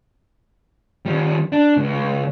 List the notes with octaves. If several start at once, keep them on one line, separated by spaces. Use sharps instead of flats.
D#3 G3
D4
C#2